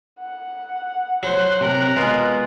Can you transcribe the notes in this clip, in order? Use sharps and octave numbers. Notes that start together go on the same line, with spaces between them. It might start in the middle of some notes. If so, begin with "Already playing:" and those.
F#5
F#3 C5 F#6
C3 A#4 A#5
B2 G#3 F4